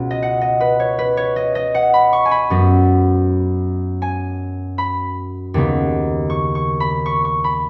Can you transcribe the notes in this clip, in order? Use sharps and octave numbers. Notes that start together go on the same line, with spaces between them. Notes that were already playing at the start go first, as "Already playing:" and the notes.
Already playing: C#2 B2 B3
D#5
F#5
D#5
B4
C#5
B4
C#5
D#5
D#5
F#5
B5
C#6
G#5
B5
F#2 F#3 B3
G#5
B5
D#2 C#3 B3
C#6
C#6
B5
C#6
C#6
B5